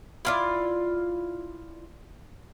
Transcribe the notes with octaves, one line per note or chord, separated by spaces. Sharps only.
E4 F4 D5